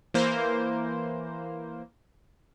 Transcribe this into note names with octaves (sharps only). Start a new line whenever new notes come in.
E3 A#3 C5